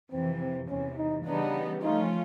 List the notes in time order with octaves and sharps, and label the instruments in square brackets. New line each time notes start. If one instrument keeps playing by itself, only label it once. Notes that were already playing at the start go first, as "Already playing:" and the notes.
[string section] F2 C3 E3 [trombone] C4
[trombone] C4
[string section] E2 C3 E3 [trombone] C#4
[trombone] D#4
[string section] C#3 E3 G3 B3 D#4 [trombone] D4
[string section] F3 A3 C#4 F4 [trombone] D#4